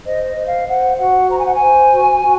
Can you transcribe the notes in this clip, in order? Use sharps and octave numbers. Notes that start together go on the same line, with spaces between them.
C5 D#5
D#5
C5
F5
C5 F#5
F#4 F#5
C5 A#5
G#5
F#5
G#5
C5
F#4
F#4